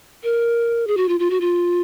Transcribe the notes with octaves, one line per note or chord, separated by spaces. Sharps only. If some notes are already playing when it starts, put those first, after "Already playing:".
A#4
G#4
F#4
F4
F4
F#4
F4